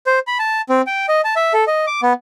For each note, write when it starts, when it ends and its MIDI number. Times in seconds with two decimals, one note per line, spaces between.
0.07 0.19 72
0.27 0.38 83
0.39 0.61 81
0.69 0.82 60
0.87 1.06 79
1.09 1.21 75
1.24 1.35 81
1.36 1.53 76
1.54 1.64 69
1.67 1.86 75
1.87 2.01 86
2.03 2.13 59